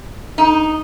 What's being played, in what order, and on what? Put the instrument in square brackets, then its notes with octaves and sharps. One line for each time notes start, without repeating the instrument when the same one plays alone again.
[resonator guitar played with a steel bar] D#4